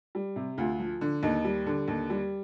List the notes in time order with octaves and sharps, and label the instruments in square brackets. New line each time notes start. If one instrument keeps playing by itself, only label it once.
[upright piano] G3
C3
D2 F4
F3
D3
D#2 D#4
G3
D3
D#2
G3